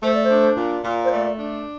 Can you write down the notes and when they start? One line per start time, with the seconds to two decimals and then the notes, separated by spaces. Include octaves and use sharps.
0.03 A3 C5
0.14 D5
0.24 C5
0.31 D4
0.57 A#2
0.84 A#2
1.05 C5
1.12 A3 D5
1.39 D4